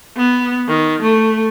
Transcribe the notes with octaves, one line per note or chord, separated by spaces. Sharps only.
B3
D#3
A3